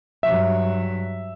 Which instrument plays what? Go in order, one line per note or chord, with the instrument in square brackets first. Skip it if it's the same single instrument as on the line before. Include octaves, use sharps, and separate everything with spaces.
[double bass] G2 F#3 [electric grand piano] E5